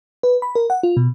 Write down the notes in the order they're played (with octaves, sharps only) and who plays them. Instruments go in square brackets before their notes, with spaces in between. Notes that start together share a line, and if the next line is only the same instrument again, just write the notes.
[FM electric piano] B4
B5
A#4
F#5
F4
B2